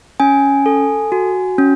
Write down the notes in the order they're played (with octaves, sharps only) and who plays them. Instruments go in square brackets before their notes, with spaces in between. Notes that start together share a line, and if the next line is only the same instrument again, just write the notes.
[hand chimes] C#4 G#5
A4
F#4
C#4